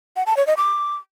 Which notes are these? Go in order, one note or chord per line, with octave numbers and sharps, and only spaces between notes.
F#5
A5
C#5
D#5
D6